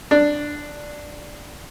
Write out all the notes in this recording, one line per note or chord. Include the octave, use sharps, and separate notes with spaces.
D4